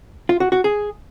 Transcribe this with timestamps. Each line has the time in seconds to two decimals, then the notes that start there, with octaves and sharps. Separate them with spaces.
0.29 F4
0.40 F#4
0.52 F#4
0.64 G#4